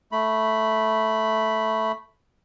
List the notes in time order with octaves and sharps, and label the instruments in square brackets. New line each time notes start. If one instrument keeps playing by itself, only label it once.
[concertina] A3 B5